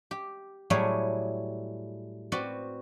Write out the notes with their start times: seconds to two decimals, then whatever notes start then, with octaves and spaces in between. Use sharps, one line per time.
0.11 G4
0.70 A2 F#3 G3 E4 G#4 C#5
2.32 C4 F#4 B4 D5